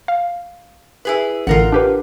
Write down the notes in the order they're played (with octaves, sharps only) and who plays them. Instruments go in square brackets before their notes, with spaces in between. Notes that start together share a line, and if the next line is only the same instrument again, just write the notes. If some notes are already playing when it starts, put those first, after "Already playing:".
[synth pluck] F5
[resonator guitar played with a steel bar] E4 G#4 B4
[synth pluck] A1 D3 [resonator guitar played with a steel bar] F4 A#4 F#5
[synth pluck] D4 G4 B4